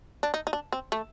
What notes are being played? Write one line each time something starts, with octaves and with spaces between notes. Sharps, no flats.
D4
D#4
D#4
D4
C4
A3